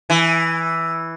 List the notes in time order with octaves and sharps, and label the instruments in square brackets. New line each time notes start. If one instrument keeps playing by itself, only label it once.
[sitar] E3